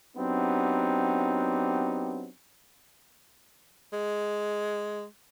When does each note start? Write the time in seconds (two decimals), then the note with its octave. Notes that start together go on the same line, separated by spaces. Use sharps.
0.17 F#3 B3 C4 D4 D#4 G4
3.93 G#3